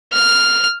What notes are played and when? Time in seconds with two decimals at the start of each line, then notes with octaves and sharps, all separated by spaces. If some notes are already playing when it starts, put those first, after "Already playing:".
0.13 F6